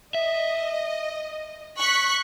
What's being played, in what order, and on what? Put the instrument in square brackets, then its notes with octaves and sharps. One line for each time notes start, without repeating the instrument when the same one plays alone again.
[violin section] D#5 [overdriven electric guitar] E5
[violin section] C#6 F#6 B6